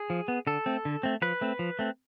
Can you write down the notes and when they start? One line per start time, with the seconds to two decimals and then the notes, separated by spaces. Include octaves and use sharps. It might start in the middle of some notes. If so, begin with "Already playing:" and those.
Already playing: G#4
0.10 F3
0.28 B3
0.47 D3 A4
0.66 A3 C4
0.85 D3
1.03 A3 C4
1.22 F3 B4
1.41 A3 C4
1.59 F3
1.79 A3 C4